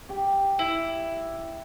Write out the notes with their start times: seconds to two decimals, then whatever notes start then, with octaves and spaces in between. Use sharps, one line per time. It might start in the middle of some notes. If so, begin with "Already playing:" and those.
0.09 G4
0.59 E4